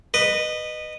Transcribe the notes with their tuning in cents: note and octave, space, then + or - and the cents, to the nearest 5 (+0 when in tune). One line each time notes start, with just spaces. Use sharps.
B4 +0 D#5 -20